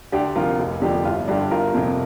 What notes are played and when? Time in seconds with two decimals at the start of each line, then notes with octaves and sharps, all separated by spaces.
0.12 D2 D4 G4
0.35 C3 F3 F4 A#4
0.59 F1
0.81 F2 D3 F3 D4 G4
1.05 G1 F4
1.28 G2 D3 D4 G4
1.51 G1 F4 A#4
1.74 F2 C3